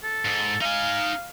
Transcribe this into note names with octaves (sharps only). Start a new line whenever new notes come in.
A4
G#2
D#4 F5 G#5